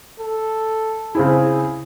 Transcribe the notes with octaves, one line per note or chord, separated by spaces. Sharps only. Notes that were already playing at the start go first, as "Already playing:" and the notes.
A4
C#3 C4 E4 G#4